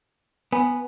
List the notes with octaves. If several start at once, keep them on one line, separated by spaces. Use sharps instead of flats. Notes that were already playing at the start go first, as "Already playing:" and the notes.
B3 G#5